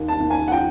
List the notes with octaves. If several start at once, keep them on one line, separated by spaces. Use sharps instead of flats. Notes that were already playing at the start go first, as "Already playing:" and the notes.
Already playing: D#2
A5
D#2
G#5
F#5
F3 G5